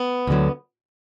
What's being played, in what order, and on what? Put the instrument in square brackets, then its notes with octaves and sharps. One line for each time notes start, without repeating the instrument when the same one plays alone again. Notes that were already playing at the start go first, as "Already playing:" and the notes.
Already playing: [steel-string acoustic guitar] B3
D2 D3 F#3